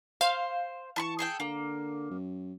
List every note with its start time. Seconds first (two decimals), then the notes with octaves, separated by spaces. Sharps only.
0.21 C5 F5
0.96 E3 A5 B5 C#6
1.19 G#4 A4 G5
1.40 D3 A#3
2.10 F#2